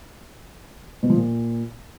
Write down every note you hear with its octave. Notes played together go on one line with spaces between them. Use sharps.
B2
F3
A#2